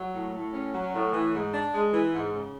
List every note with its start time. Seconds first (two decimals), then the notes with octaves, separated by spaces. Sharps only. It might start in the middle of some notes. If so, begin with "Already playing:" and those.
Already playing: F#3
0.14 A2
0.33 A2
0.53 C#4
0.73 F#3
0.93 A2
1.13 E3
1.34 G#2
1.53 D4
1.73 G#3
1.93 E3
2.13 G#2
2.33 C#3